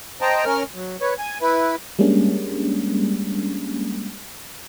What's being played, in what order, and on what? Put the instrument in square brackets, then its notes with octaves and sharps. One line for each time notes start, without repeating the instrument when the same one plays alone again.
[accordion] C5 D#5 G5 A5 A#5
C#4 A#4 F6
F#3
B4 C#5
G#5
E4 B4
[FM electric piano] G3 G#3 A#3 C#4 D4